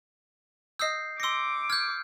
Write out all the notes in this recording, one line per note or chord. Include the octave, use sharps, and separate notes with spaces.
D#5 D#6 E6 G6 C7
C6 D6 E6 A#6 C#7
F6 G6 G#6